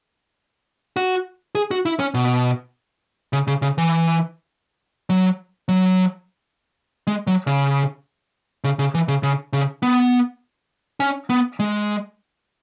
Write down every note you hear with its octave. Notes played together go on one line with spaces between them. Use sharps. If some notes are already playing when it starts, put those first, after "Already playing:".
F#4
G#4
F#4
E4
C#4
B2
C#3
C#3
C#3
E3
F#3
F#3
G#3
F#3
C#3
C#3
C#3
E3
C#3
C#3
C#3
B3
C#4
B3
G#3